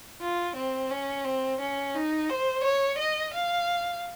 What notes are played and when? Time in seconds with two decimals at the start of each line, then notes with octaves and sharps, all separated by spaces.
0.21 F4
0.56 C4
0.91 C#4
1.25 C4
1.61 C#4
1.95 D#4
2.30 C5
2.64 C#5
2.98 D#5
3.34 F5